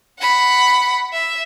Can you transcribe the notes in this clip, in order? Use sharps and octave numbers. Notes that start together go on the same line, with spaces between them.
F#5 B5
E5